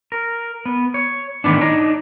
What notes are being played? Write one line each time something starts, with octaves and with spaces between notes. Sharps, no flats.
A#4
B3
C#5
A2 D#3 E3 B3 D4
D4 D#4 C#5 D#5